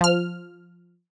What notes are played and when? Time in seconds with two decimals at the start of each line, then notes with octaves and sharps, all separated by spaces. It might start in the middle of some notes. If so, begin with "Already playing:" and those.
0.01 F3 F6